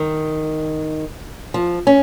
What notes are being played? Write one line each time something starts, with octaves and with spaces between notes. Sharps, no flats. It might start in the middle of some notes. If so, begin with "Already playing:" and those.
Already playing: D#3
F3
C#4